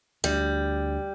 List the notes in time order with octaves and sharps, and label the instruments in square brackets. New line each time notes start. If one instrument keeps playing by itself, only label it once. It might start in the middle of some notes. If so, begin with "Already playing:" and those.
[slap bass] D2 [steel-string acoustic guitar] G3